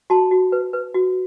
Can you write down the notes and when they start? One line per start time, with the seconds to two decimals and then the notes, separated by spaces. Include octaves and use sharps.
0.10 F#4 A5 C6
0.31 F#4
0.52 B4
0.73 B4
0.94 F#4